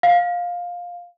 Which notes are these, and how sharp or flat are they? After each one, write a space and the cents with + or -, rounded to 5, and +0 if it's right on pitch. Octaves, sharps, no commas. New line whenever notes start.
F5 +15